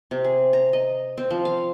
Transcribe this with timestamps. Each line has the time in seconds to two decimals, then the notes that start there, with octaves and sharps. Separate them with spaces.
0.11 C3
0.24 G#4
0.53 A#5
0.73 D#5
1.18 C4
1.30 F3
1.45 F5